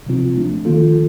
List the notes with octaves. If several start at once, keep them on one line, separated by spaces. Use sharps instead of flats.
C3 F3 C4 F4
F3 A3 D4
D#3 A#3 F4 A4